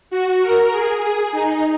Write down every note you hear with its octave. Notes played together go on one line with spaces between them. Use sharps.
F#4
A#4
G#4
G#4
D#4